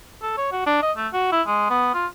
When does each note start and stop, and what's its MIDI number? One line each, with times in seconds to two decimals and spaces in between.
0.22 0.34 69
0.37 0.48 73
0.52 0.62 66
0.66 0.78 62
0.82 0.92 75
0.97 1.08 57
1.13 1.31 66
1.32 1.42 64
1.47 1.68 56
1.70 1.90 59
1.94 2.06 65